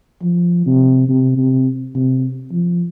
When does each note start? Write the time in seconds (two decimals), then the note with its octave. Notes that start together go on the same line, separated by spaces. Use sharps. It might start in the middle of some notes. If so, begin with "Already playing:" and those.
0.23 F3
0.66 C3
1.08 C3
1.37 C3
1.95 C3
2.52 F3